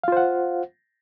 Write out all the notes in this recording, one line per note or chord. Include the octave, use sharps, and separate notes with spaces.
F4 C5 F5 F#5